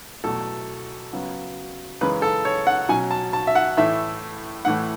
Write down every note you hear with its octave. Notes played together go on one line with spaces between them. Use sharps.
E2 B2 F#3 A3 A4
C#3 F#3 B3
F#2 C#3 E3 G#3 B4
A4
C#5
F#5
B2 F#3 C#4 G#5
A5
A5
E5
F#5
A2 E3 A3 E5
A2 E3 A3 F#5